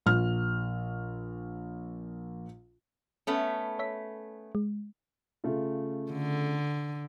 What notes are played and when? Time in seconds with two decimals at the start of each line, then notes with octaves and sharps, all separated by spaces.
0.06 A#1 F6
3.27 A3 B3 C#4
3.79 C#5 E5 B6
4.55 G#3
5.44 C#3 A3 F4
6.12 D3